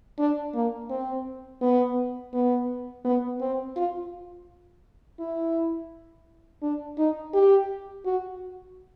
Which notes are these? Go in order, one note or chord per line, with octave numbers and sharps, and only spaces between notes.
D4
A#3
C4
B3
B3
B3
C4
F4
E4
D4
D#4
G4
F#4